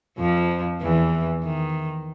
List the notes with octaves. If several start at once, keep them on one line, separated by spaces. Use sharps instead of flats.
F2 F3
E2 E3
D#3